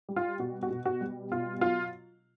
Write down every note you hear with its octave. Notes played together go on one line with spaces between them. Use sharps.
G3
F4
B2 F#4
F#4
B2
F#4
G3
B2 F4
F#3 F4